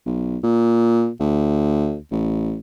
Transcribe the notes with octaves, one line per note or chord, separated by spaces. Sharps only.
B1
A#2
D2
A1